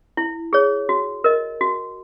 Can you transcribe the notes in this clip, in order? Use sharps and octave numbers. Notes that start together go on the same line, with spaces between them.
E4
G#4 C#5
F#4
A#4 D#5
F#4